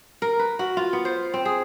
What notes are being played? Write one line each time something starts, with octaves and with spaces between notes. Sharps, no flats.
A#4
B4
F#4
F4
B3
C5
C4
G#4